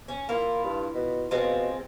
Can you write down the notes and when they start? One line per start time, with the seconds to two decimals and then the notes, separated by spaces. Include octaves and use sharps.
0.08 C#4
0.29 A#3 E4 F4
0.64 G2
0.94 B2
1.31 B2 F3 G#3 C4